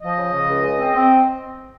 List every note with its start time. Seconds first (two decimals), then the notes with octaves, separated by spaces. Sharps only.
0.02 F3 D#5
0.17 C#3
0.33 C#3
0.49 C#2
0.64 G#3
0.79 C4
0.95 C4